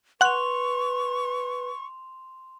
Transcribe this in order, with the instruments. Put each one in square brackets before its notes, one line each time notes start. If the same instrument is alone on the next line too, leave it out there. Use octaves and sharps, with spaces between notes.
[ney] B4 [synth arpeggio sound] F#5 F#6 [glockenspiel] C6 F7 [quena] C#6